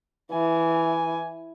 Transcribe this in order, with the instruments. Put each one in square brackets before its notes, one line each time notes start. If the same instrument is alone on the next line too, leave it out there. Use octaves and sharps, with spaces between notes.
[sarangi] E3 [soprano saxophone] G#5